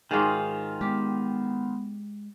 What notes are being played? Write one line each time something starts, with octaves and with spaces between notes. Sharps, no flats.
G#2 D#3 F4 F#4 G#4
G#3 B3 G4